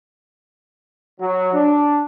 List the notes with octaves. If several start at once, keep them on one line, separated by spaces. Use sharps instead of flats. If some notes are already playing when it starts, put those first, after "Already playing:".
F#3
D4